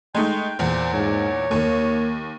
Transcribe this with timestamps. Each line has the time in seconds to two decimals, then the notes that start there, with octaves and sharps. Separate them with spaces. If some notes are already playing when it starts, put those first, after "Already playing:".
0.15 G#3 A3 D#4 G5
0.59 E2 A#2 C5
0.93 G#2 C#5
1.51 D#2 A#3